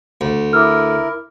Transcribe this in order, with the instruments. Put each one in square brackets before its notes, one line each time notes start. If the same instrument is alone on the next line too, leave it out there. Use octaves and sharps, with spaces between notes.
[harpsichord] D2
[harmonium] E4 A#4 [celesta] D6 E6 F6